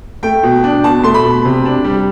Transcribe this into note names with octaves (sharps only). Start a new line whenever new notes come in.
A3 G5
B2
D4
B2 A5
A3 C6
B5
B2
C3
D4
G3